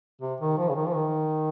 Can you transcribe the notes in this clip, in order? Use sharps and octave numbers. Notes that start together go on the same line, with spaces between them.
C3
D#3
F3
C#3
D#3
F3
D#3